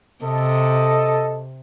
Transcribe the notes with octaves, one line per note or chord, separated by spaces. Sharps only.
C3 A4 D#5